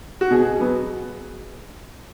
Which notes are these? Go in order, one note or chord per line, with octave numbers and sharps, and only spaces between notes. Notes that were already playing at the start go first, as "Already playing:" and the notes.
F#4
B2 G#4
F#3 B3